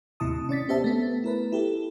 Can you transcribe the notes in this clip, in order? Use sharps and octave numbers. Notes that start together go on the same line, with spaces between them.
D#2 A2 C3 E4 A5 D#6
C#4 D5 A6 B6
B3 G4 C5 E5 A5
A3 B3
E4 A#4 B4
E4 G4 A4